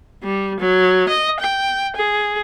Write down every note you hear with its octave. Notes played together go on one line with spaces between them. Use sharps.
G3
F#3
D#5
G5
G#4